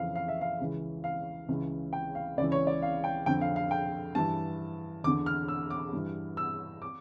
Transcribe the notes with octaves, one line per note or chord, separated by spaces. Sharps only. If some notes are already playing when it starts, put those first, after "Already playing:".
Already playing: F2 C#3 E3 F5
F5
E5
F5
C#2 C#3 E3
F5
C#2 C#3 E3
G5
F5
C#2 C#3 E3 D5
C#5
D5
F5
G5
F2 D3 G5
F5
F5
G5
G2 E3 A5
E2 D3 D6
F6
E6
D6
G2 E3
E6
D6